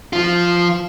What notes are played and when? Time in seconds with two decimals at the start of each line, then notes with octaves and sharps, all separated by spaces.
0.13 F3 F4